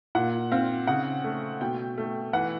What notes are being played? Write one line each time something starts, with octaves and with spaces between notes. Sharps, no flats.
A#2 F#5
C4 F5
C#3 F#5
A3
B2 G5
A3
E3 F#5